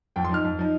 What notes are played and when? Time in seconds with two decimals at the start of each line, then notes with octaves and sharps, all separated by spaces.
0.16 F2 G5
0.25 C6
0.29 F3 D#4 F6
0.44 F2
0.59 F3 D#4